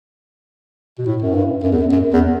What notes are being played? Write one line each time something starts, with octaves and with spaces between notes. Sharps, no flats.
B2
A2
F#2
G2
F#2
E2
F#2
F#2
E2